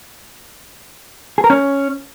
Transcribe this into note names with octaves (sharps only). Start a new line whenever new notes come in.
G#4
A#4
C#4